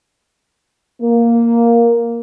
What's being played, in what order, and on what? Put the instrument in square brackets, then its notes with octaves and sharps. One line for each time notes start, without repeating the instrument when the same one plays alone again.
[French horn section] A#3